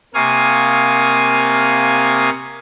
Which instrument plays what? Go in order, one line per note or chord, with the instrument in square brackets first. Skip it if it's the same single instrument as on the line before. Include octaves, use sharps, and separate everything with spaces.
[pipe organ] C3 A#3 F5 G#5 C#6 D#6